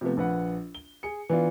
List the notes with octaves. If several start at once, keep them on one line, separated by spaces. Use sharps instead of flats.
C3 F3 A3 B3
A#1 B4 F#5
G7
G#4 C#7
E3 B3 D4 F4